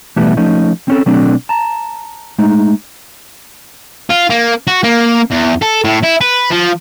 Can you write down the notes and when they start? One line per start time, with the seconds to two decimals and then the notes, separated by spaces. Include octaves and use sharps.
0.16 B2 E3 G3 A3 B3 E4
0.37 F3 A3 C#4 D#4
0.88 C4 C#4 A4
1.06 B2 F#3 A3 C4 D4
1.49 A5 A#5
2.39 G#3 A3 D#4
4.10 F4
4.30 A#3
4.67 F#4
4.83 A#3
5.31 E2
5.62 A4
5.85 A2
6.04 E4
6.21 B4
6.51 F3